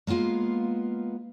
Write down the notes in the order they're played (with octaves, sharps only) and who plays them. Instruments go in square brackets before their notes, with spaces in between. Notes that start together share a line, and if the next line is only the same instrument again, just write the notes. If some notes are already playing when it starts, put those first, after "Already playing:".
[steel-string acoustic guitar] G#3 A#3 B3 F4 F5